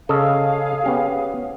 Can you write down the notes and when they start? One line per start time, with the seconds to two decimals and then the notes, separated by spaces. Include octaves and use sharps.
0.09 C#3 G#4 A4 D#5 F5
0.84 B3 C#4 G4